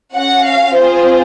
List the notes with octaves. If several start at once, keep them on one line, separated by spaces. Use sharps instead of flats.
C#4 F#4 F#5
F5
C4 F4 G#4 C5